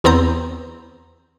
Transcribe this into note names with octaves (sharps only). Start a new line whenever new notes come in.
E2 B3 C4 A#5 G6